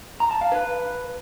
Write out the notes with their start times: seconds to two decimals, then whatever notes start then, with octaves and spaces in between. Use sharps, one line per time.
0.20 A#5
0.31 A5
0.41 F5
0.52 B4